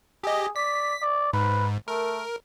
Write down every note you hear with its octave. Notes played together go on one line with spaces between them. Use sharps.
G4 G#4 D#5
D5 B6
D5
G#2 B4
A3 A#4